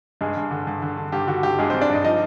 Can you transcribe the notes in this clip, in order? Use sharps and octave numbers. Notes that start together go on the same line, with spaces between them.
G2 G#3 G#4
G2
D3
G2
D3
D3
G2 G4
D3 F#4
G2 G4
G2 G#3 G#4
G2 C4 C5
D4 D5
G2 D#4 D#5
F3 D#4 D#5